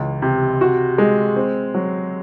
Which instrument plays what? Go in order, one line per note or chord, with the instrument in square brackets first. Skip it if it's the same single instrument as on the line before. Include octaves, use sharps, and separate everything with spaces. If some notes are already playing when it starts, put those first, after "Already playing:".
Already playing: [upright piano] C#2 E3
C3
F#4
G#3
C4
F#3